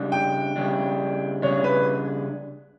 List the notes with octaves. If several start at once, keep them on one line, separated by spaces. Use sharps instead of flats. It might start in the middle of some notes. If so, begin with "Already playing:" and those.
Already playing: C#3 G3 D4
G5
C#3 G3 D4
C#3 G3 D4 C#5
B4